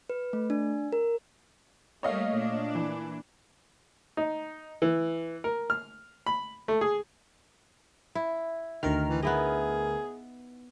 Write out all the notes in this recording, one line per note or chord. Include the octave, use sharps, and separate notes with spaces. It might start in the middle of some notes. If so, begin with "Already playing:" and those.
B4
A3
D4
A#4
G3 A3 A#3 C#5 D#5 F5
A#2 D4
E3
D#4
E3
A#4
F6
B5
A3
G#4
E4
D2 D#3 A#4 F6
E3
B3 E4 G#4 D#5